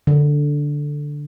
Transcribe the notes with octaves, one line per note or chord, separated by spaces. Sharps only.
D3